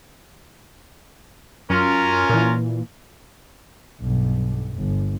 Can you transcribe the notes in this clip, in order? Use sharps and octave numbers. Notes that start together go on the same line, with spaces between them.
F#2 C#4 F4 A#4
A#2 E3
B1 G2
G1